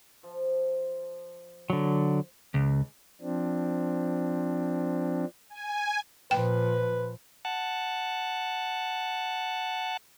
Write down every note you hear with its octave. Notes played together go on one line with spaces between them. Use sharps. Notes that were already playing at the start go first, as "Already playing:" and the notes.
F3
D3 F#3
C#2
F3 C4 D4
G#5
A#2 F3 B4 G5
F#5 A5